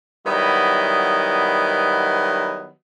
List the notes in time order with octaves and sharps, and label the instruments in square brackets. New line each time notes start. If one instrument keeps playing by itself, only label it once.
[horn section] D#3 F#3 G3 B3 E4 D#5